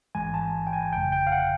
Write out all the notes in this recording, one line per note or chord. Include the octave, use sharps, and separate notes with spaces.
A1 G#2 E3 G#3 G#5
A5
G5
G#5
G1 F2 C#3 G5
G5
F5
F#5